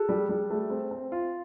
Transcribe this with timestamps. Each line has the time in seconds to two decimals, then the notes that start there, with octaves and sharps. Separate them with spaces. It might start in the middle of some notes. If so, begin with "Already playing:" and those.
Already playing: F#4 G#4 A4
0.09 G3
0.29 G3
0.50 A3
0.70 C4
0.91 C4
1.12 F4